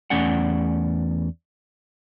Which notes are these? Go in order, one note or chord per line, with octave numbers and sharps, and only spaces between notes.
E2 A3 C#4 D5 F#5